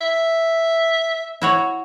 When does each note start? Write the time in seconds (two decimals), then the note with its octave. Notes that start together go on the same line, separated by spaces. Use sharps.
0.01 E5
1.42 E4 F#4 C#5